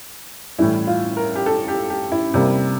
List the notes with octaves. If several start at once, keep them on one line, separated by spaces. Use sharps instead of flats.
A2 E3 G3 E4
F4
A#4
G4
A4
G4
G4
E4
C3 G3 A#3